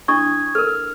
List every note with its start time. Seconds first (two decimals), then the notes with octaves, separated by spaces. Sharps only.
0.08 D4 E4 C#6 D#6 G#6
0.55 A4 A#4 F6